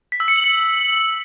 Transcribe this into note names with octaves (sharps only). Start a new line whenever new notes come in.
B6
E6
C#7
F#7
C#7